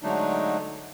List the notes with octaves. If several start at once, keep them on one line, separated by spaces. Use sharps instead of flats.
D3 F#3 G#3 A3 D4 D#4